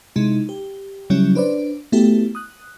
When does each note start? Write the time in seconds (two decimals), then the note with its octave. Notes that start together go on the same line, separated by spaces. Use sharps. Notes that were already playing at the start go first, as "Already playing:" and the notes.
0.16 C3 G#3 D#4 E4
0.49 G4
1.10 C#3 F#3 G3 C#4 E4
1.35 D4 B4 C5 D5
1.92 A3 B3 E4 F#4 G4 A4
2.35 D#6 F#6